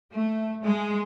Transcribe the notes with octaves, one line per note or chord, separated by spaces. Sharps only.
A3
G#3